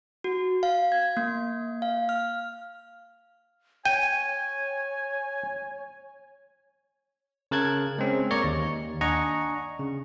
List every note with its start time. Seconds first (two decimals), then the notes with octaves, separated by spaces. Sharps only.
0.24 F#4
0.63 F5
0.92 G#6
1.17 A#3
1.82 F5
2.09 F6
3.85 C#5 G5 G#5 D#7
7.51 C#3 A#4 A5 F#6 G#6
7.98 G#3 C4 C#4
8.31 A#3 C#5 D5 A#5 C#6
8.44 D#2
9.01 D4 D#5 F#5 G#5 A#5 C#6
9.79 C#3